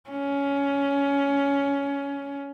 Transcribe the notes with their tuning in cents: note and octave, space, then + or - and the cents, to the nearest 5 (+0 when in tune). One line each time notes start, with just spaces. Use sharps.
C#4 +15